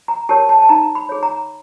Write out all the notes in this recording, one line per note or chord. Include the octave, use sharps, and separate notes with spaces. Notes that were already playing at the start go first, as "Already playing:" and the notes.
A#5
G4 A#4 C#5 A5
A5
A5
D#4 A#5
B5
G#4 C#5
A#5